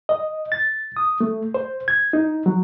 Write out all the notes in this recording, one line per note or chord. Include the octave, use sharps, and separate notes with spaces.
D#5
A6
D#6
A3
C5
G#6
D#4
F#3